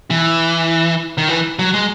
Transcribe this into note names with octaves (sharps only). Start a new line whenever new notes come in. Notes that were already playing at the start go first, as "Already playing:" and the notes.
E3
D#3
E3
F#3
G#3